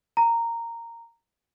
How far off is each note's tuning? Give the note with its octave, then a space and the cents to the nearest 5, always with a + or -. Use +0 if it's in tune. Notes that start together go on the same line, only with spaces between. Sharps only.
A#5 -10